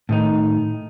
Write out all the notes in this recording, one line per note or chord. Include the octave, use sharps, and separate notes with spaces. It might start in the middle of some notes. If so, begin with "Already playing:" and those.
A2 D#3 D#4